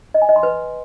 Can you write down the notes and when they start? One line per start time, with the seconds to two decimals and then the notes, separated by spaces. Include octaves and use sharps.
0.14 D#5
0.22 G#5
0.29 D#5
0.36 C6
0.43 B4